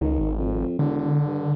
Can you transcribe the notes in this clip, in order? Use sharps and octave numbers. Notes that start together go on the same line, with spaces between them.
C#2 D#3
G#1
F2
E1 D3
G2